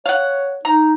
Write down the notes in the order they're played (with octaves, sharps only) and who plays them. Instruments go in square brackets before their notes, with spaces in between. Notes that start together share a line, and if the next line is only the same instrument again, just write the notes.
[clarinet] C#5 [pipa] F5 F#5
[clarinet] D#4 [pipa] A#5